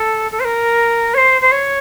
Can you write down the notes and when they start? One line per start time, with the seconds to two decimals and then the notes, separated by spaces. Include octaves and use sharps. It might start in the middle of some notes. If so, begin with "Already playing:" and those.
Already playing: A4
0.31 A4
0.39 C5
0.44 A#4
1.14 C#5
1.17 C5
1.41 C5
1.51 C#5